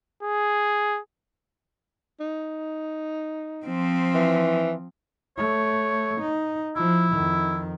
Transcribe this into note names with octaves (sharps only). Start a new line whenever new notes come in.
G#4
D#4
F3 C4
E3
A3 C#5
D#4
F3 E4
F2 D#3